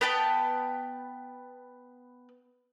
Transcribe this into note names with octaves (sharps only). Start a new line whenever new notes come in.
B3 B4 G5 A5